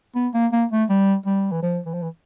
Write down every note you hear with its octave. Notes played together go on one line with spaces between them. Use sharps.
B3
A#3
A#3
A3
G3
G3
E3
F3
E3
F3
E3